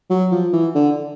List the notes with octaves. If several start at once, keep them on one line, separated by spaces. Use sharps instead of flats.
F#3
F3
E3
D3